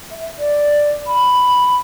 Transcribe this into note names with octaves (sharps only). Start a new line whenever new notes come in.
E5
D5
B5